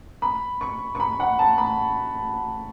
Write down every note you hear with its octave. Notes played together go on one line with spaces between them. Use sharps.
B5
C#6
C#6
B5
F#5
A5
B5